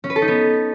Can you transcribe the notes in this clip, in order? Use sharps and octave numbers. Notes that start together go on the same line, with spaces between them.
C#4
B4
A4
D#4
B3